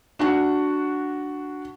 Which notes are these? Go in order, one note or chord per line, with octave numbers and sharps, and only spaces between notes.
D4 F#4 F#5